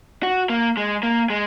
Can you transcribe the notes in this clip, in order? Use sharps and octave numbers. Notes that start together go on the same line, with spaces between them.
F#4
A#3
G#3
A#3
G#3